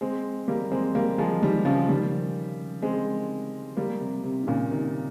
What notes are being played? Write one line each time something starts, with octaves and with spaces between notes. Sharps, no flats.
G#3 C4
G3 A#3
G#3 C4
G3 A#3
F3 G#3
D#3 G3
C#3 F3
D#3 G3
G#3 C4
G3 A#3
C3
C3
D#3
A#2 C#3
C3 D#3